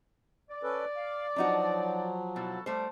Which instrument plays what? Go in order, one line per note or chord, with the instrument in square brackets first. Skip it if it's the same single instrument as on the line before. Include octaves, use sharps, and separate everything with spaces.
[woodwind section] D5
[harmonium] C#4 A4 B4
F5
[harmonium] F3 F#3 [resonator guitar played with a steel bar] D4 D#4 F#4
[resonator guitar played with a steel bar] B2 [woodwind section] E4 F#4 A4
[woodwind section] G3 [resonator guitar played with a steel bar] A3 C5